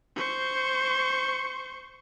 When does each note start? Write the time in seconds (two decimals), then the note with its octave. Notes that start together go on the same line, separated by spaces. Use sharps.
0.16 C5 C#6